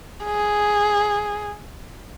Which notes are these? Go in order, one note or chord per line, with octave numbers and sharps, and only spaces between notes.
G#4